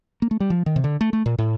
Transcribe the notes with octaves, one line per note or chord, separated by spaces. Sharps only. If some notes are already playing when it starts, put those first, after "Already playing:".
A#3
A3
G3
F3
D#3
C3
D3
A3
A3
A#2
A2